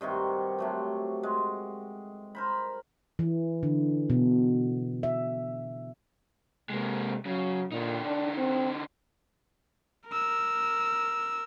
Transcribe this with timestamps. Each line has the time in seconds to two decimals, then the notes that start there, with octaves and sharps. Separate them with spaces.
0.01 G2 C3 D#3 F#4
0.58 C3 F#3 A3
1.23 G#3
2.35 A#4 C5 B5
3.19 E3
3.63 D3
4.10 B2
5.03 E5
6.70 C3 G#3 A#3
7.26 C#3 F#3
7.72 A#2 D3 D#4
8.04 D4
8.38 C4
10.09 A#4 E6